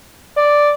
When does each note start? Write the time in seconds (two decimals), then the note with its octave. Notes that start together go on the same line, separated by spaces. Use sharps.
0.37 D5